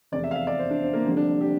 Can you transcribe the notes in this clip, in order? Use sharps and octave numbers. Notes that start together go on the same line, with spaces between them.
F1 E2 C3 D5
E5
F5
E5
D5
C5
D4
C4
A#3
F1 F2 D3 G3 C4
D4
G4